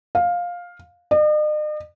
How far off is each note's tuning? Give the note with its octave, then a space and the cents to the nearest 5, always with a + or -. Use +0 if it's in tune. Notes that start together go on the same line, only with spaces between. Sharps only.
F5 +10
D#5 -45